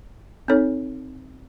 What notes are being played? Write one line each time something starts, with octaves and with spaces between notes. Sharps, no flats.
C4 D#4 A4 C#5